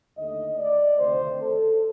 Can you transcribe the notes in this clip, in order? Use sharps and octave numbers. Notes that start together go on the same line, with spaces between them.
D#2 D3 A3 D#5
D5
D2 C3 D#3 A3 C5
A4